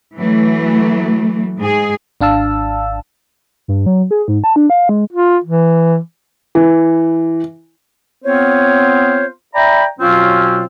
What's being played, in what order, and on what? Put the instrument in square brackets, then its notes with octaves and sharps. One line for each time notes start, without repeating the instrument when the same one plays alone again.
[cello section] E3 F#3 A3
G#2 G#4
[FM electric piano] G#1 D4 F5 A5 E6
[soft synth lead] G2
F#3
G#4
G#2
A5
D4
F5
G#3
[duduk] F4
E3
[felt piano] E3
[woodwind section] B3 C4 F4 C5 C#5
D5 E5 G5 A#5 B5
B2 F#3 C4 C#4 F4